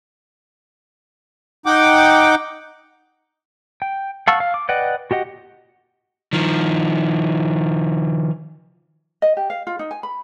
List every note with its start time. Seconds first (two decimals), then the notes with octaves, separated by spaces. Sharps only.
1.66 D#4 F#5 G5 D6
3.82 G5
4.28 F5 F#5 A5 C#6 E6
4.40 F5
4.54 D6
4.69 B4 D5 D#5 F#5 G5
5.11 F#4 G4 D#5 F#5
6.33 D#3 F3
9.22 D#5
9.37 G4
9.50 F5
9.67 F4
9.79 D#4
9.91 G#5
10.03 B5